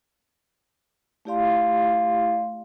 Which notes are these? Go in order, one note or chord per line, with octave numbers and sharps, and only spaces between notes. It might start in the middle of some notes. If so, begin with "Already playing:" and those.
A3 E4 G4 D5 F5 C6